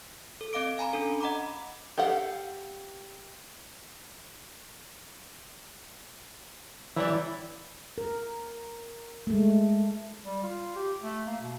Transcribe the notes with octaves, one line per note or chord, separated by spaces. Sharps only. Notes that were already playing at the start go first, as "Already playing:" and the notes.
A4
C4 D#5 F5 D6 D7
F5 G#5 A#5 B5
C#4 D4 A4
D#5 F#5 A#5 B5 D6
G4 A4 F5 F#5
E3 F#3 G3 D5
A#4
G#3 A3
G3
F4
G4
A3
A#3
B2